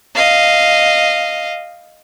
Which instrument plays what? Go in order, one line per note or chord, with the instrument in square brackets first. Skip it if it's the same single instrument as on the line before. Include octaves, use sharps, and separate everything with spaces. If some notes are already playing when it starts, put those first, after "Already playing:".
[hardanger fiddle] D#5 F5